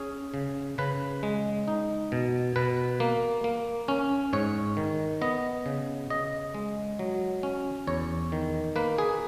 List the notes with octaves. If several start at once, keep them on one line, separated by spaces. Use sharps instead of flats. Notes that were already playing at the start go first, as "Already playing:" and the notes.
Already playing: C#4 G#4
C#3
C#3 B4
G#3
D#4
B2
B2 B4
A#3
A#3
C#4
G#2 C#5
D#3
B3 D#5
C#3
C#3 D#5
G#3
F#3
C#4
E2 C#5
D#3
A#3 B4
G#4